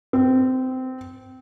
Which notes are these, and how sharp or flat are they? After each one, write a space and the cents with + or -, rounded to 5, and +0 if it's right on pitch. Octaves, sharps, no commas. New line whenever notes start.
C4 -20